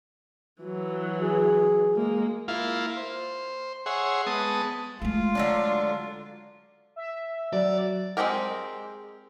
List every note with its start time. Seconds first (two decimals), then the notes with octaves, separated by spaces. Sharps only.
0.63 E3 F#3
1.21 G#4
1.95 G#3 A#3
2.48 A#3 E4 F4 F5
2.97 C5
3.86 G#4 C#5 E5 F#5 C6
4.27 G#3 B3 A5 D#6
5.02 G#3 A3 F4
5.35 D3 F#3 D4
6.96 E5
7.53 F#3 D5
8.17 G#3 A3 C4 G4 A#4